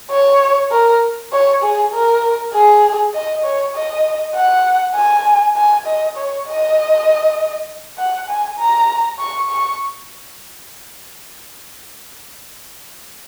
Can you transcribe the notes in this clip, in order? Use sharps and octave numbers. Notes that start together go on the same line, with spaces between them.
C#5
A#4
C#5
G#4
A#4
G#4
D#5
C#5
D#5
F#5
G#5
G#5
D#5
C#5
D#5
F#5
G#5
A#5
C#6
C#6